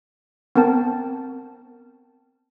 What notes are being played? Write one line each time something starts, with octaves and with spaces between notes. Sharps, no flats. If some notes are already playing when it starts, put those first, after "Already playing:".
B3 C4 A#4 G5 A5